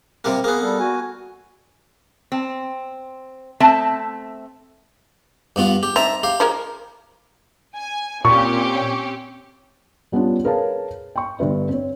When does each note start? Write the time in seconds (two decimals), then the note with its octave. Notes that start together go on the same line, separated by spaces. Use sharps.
0.24 C3 G3 A#3
0.44 A#3 B3 G#4
0.61 G3 A4
0.79 F#4 G#5
2.32 C4
3.60 A3 C4 E5 A5
5.56 G2 B3 F4
5.83 G4
5.96 C4 D#4 E5 A5 A#5
6.23 G4 F5
6.40 F3 G#3 A#4
7.76 G#5
8.25 A#2 C4 C#4 G4 C#6
10.12 G3 B3 C#4 D4 F4
10.44 G#4 A#4 B4 C#5 F5 A5
11.16 G5 C#6
11.39 G1 G2 B4 E5
11.69 C4 C#5